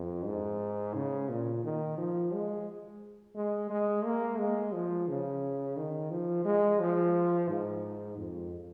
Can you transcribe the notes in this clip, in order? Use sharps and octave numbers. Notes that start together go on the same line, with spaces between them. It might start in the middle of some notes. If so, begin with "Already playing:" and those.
Already playing: F2
G#2
C#3
A#2
D#3
F3
G#3
G#3
G#3
A#3
G#3
F3
C#3
D#3
F3
G#3
F3
G#2
F2